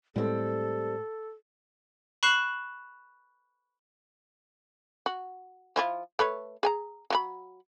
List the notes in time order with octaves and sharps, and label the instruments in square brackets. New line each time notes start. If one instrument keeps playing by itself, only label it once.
[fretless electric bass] A2 G#3 [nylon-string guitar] G3 C4 [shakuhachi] A4
[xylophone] B5 C#6 F#6 C7 E7 F#7
[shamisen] F#4
F3 E4 F4
A3 B4 C#5
G#4 G#5 A#5
F#3 F4 B5